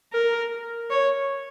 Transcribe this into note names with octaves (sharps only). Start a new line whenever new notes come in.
A#4
C#5